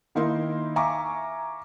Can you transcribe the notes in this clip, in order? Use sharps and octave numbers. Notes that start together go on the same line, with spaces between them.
D#3 A#3 D#4 E4 A#4 C6
E5 F5 G#5 A#5 C#6 D6